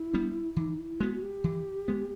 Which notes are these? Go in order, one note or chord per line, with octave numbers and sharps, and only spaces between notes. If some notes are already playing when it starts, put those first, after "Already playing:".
Already playing: E4
G3 B3 D4
E3 D#4
E4
G#3 B3 F#4
F#4
G4
E3
G#3 B3